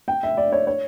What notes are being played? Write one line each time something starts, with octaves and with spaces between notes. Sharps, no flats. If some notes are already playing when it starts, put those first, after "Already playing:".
G5
E5
D5
C#5
C#5